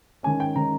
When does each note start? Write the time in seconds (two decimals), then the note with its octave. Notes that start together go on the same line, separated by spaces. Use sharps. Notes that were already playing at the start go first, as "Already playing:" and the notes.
0.23 D#3 G#3 C#4 G#5
0.40 G5
0.56 D#3 G#3 C#4 A#5